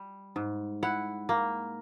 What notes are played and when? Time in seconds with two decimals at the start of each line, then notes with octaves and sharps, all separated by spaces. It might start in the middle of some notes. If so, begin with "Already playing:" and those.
Already playing: G3
0.36 G#2
0.83 E4 F#5
1.29 A#3